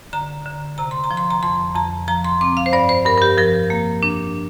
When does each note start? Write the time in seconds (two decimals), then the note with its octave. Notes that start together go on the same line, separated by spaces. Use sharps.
0.13 D3 A#5
0.46 D3
0.78 C3 A#5
0.91 C6
1.04 A#5
1.11 F3
1.17 C6
1.31 A#5
1.43 F2 C6
1.75 F2 A#5
2.08 F3 A#5
2.25 C6
2.41 C4 D6
2.57 F5
2.66 C5
2.73 G2 D5
2.89 C5
3.06 G2 A#4
3.18 A#4
3.22 G4
3.38 F3 A#4
3.70 A#3
4.03 D4